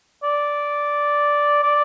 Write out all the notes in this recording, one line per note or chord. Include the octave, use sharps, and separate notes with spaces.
D5
D5